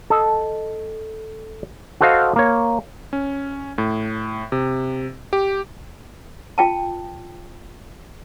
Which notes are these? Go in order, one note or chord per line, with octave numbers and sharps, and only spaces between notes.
A4 D#5
F#4 A4 C5 D#5 F5
A#3 C#5
C#4
A2
C3
G4
F4 G5 A5